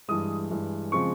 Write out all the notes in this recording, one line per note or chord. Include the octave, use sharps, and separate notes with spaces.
G2 E3 G#3 D#6
G2 E3 G#3
C#3 F3 G#3 C4 F4 C#6